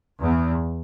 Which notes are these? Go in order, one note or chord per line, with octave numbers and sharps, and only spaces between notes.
E2